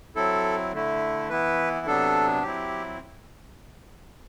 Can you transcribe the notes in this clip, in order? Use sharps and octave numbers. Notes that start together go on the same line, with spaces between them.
F#3 C4 E4 A4
D3 A3 E4
E3 B3 E4 B4
C3 F#3 B3 D4 A4
F#3 C4 E4 G4